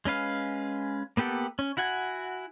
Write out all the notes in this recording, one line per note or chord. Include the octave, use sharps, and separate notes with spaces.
G#3 C#4 B4 F5
A#3 B3 G4 A4 F#5
C#4
E4 F#4 F#5 G#5